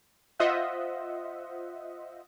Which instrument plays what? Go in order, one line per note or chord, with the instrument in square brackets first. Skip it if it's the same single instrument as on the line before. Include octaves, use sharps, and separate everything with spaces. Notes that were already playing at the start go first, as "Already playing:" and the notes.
[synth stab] F4 C5 D#5 E5 F#5